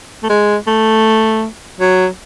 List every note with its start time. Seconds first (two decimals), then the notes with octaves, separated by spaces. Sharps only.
0.23 A3
0.30 G#3
0.67 A3
1.80 F#3